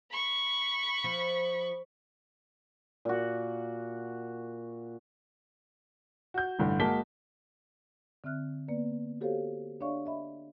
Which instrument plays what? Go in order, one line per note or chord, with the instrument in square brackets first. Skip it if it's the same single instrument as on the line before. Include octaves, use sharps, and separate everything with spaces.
[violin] B5 C#6
[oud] F3
[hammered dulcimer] A#2 F#4
[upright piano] F#4 G6
A1 G2 D3
G#3 A#3 F#4 A5 B6 G7
[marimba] D3 C4 E5 F6 F#6
A#3 B3 B4 D5
F#4 G4 A4 C5 C#5 F5
D4 C#5 D5 E5 F5 C#6
D#5 E5 B5